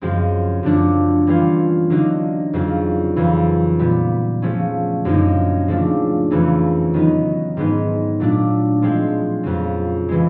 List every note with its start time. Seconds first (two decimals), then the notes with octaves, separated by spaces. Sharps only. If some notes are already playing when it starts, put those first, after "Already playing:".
0.01 F#2 C#3 F3 G#3 C4
0.63 F#2 D3 F3 A3 D4
1.27 E3 G3 A#3 C#4 F4
1.90 D3 F#3 A#3 D#4
2.53 F2 C#3 F#3 A#3
3.16 F2 C#3 E3
3.79 A#2 G3 B3
4.42 C#3 F3 A3 C#4
5.05 F#2 D3 F3 A#3 D#4
5.68 C#3 F3 A3 D4
6.30 F2 C#3 E3 A3 C#4
6.94 D#3 F#3 B3 D#4
7.57 G#2 D#3 G#3 B3 D#4
8.20 A#2 F#3 A3 D4
8.82 A2 F3 G#3 C4
9.43 F2 C#3 F#3 B3
10.09 C#3 E3 G#3